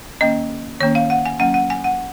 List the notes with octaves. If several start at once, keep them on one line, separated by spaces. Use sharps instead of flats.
D#3 A#3 C#4 D#5
D#3 A#3 C#4 C#5
F5
F#5
G#5
F#3 A#3 C#4 F#5
F#5
G#5
F#5